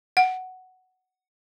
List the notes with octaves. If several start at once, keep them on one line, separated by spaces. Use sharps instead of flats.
F#5